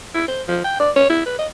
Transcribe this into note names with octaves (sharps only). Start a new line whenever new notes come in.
E4
C5
F3
G5
D5
C#5
E4
B4
D#5